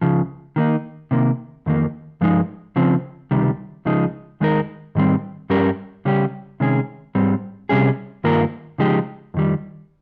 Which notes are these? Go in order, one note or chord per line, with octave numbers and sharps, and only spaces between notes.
C#2 C#3 F3
D#3 A#3 D#4
C3 D#3 A#3
F2 D#3 A#3
G2 F3 G#3 D#4
C#3 F3 C4
C#2 C3 D#3 G3
C#2 C#3 F3 G#3 D#4
D#2 D#3 G#3 D#4 A#4
G#2 D#3 G3 C4
G2 G3 C#4 G4 A#4
C#3 G3 C#4 G4
C3 D#3 G#3 C#4 G#4
G#2 G3 C4
C3 G3 C#4 G#4
G2 D#3 A#3 F4 A#4
C#3 F3 G#3 D#4 G4
F2 D#3 G3